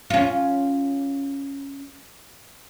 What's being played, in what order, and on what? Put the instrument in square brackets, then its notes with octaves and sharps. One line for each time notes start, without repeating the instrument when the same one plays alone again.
[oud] C#4 F4